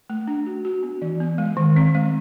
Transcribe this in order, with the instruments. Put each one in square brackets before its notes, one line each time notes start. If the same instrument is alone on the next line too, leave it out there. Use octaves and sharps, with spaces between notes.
[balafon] A3
D4
F#4
F#4
B3
E3
B3
G#3
D#3
C4
G#3